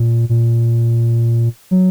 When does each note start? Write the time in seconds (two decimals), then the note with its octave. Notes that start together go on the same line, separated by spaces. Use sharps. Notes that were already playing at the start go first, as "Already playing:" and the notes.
Already playing: A#2
0.29 A#2
1.71 F#3